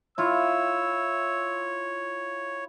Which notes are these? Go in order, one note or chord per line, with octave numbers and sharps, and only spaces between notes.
E4 F4 C#5 E6